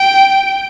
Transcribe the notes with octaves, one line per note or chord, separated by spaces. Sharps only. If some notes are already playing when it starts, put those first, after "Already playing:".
Already playing: G5